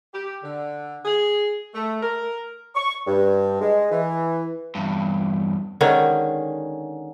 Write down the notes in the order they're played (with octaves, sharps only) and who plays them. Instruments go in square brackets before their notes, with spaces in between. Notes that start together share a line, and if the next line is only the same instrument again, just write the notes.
[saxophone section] G4
D3
G#4
A3
A#4
[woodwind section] C#6
G2
G#3
E3
[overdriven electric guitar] E2 G2
[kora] D3 D#3 G#3 C#4